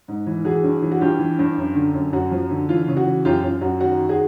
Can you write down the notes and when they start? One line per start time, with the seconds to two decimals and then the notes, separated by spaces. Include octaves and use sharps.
0.08 G#2
0.27 E3
0.45 E3 F#4 G#4
0.63 G2
0.82 E3
0.91 F#4
1.01 G2 F4 G4
1.19 E3
1.39 G2
1.58 F#2
1.75 D3
1.94 F#2
2.13 F#2 F#4
2.31 F3
2.51 D3
2.69 E3 F4
2.88 C#3
2.97 F#4
3.06 E3
3.25 F#2 F4 G4
3.43 F#2 F4
3.61 F#2 F#4
3.80 D#3 F#4
3.99 D#3
4.09 F#4 G#4